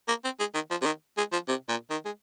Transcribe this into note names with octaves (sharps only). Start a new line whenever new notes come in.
A#3
C4
G#3
D#3
F3
C3
D#3
G#3
F3
C3
A#2
D#3
G#3